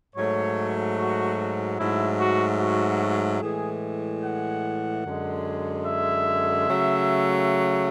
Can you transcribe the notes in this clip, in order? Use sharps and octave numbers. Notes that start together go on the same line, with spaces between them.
G#2 F#3 A3 C#5
F#4
G#2 F#3 A3 E4
F#4
F#4
A2 E3 G#3 G#4
F#5
F#2 D3 G#3
E5
C#3 F#3 A3